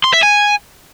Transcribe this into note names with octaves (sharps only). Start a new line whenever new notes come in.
C6
E5
G#5